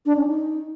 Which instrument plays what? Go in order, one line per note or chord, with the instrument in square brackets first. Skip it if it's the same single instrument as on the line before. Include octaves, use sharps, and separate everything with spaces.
[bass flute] D4
C#4
D#4